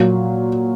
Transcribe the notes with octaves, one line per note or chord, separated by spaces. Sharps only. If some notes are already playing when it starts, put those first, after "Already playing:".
Already playing: A#2 F#3 A#3